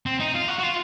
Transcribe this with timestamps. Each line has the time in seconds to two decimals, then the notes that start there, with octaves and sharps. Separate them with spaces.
0.06 C4
0.20 D#4
0.35 F4
0.48 F#4
0.59 F#4
0.63 F4